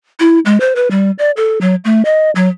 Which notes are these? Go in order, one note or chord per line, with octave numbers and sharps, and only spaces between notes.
E4
G#3
C5
B4
G3
D5
A4
F#3
A3
D#5
F#3